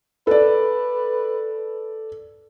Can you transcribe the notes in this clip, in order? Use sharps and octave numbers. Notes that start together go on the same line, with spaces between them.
A4 B4 D5